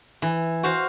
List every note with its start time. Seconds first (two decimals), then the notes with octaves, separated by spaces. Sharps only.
0.22 E3
0.63 F#4 C5 F5